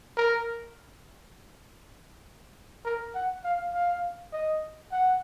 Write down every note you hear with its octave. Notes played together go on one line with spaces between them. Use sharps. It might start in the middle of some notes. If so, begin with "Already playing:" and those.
A#4
A#4
F#5
F5
F5
D#5
F#5